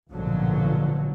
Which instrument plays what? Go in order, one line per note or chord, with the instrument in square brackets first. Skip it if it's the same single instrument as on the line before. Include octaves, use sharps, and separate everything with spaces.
[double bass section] A#1 G#2 B2 D3 F3 F#3